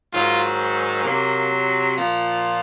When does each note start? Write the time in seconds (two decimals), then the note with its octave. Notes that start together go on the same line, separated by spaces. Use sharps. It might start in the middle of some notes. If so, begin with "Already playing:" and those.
0.12 G#2 D#3 F#3 F4
1.03 C3 F#3 A#3
1.94 A#2 F3